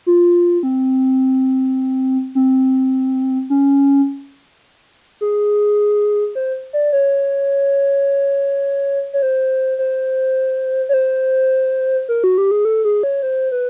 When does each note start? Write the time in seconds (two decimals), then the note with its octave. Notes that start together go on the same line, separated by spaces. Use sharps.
0.06 F4
0.63 C4
2.35 C4
3.50 C#4
5.21 G#4
6.35 C5
6.73 D5
6.93 C#5
9.13 C#5
9.22 C5
9.79 C5
10.89 C#5
10.94 C5
12.09 A#4
12.24 F#4
12.38 G4
12.51 G#4
12.65 A4
12.85 G#4
13.03 C#5
13.23 C5
13.52 B4